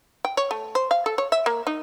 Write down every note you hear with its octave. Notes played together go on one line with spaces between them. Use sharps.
G5
C#5
A3
C5
F5
A4
C#5
E5
A#3
D#4